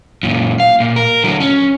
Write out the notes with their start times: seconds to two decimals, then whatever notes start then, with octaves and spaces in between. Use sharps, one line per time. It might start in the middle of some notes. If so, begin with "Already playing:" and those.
0.23 F#2 A#2
0.60 F5
0.80 A#2
0.96 A#4
1.24 D3 F#3
1.40 C#4